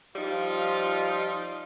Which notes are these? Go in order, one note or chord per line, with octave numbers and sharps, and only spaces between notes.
F3 G3 D#4 F4